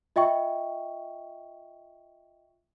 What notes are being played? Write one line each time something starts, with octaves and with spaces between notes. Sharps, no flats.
F4 D#5 E5 G5 C#6